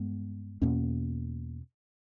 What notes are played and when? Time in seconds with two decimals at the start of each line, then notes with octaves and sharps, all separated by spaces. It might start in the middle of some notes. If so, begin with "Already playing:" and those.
Already playing: G2 G#3 B3
0.62 E2 B2 A#3 C#4